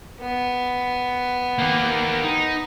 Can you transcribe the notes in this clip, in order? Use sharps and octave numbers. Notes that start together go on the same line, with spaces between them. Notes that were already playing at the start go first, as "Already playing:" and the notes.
B3
A#3 G4
D#4